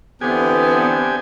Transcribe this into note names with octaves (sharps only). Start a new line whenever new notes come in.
D3 E3 B3 C4 D4 G4 G#5